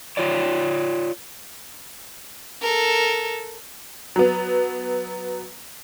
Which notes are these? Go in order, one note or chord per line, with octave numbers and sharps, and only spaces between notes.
F4 C#5 D5
A4 A#4
F#3 B3